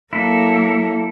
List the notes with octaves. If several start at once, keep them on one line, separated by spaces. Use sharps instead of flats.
F#3 A#3 E4 A4